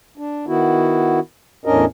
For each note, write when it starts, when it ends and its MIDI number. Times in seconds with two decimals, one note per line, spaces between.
0.18 0.45 62
0.47 1.20 51
0.47 1.20 59
0.47 1.20 64
0.47 1.20 66
1.65 1.85 40
1.65 1.85 45
1.65 1.85 61
1.65 1.85 62
1.65 1.85 70
1.65 1.85 75